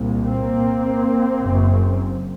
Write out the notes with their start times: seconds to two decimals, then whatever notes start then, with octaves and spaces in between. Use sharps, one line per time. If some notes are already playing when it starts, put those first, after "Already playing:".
Already playing: C2 A#2
0.25 A#3 C4
1.42 F#1 F#2 C#3